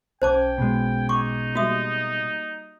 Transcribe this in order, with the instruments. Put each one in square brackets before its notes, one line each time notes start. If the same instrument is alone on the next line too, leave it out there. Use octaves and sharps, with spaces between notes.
[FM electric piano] B1 C#4 G#6 [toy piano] C5 A5 D6 [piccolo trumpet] G5
[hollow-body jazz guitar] B2 G#3
[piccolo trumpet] D#4 [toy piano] C#6 D6
[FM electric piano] G3 A#3 [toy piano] F#4 E5 D#6